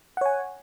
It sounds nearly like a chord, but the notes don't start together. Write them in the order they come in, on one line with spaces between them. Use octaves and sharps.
F#5 C#5 G#5